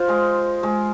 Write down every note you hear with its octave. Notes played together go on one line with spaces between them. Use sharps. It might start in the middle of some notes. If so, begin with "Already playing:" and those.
Already playing: F4 C5
G#3
G#3